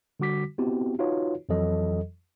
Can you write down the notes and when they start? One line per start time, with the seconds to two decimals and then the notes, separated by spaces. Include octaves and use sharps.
0.20 D3 G3 F#4 D6 B6
0.58 B3 C4 E4 F#4 G4
0.99 D#4 F4 F#4 B4 C#5
1.49 F2 E3 F#3 A4 D#5